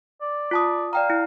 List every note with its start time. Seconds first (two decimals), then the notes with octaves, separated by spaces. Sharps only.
0.21 D5
0.51 F4 A5 D#6
0.93 D5 F5 G5 A#5
1.10 E4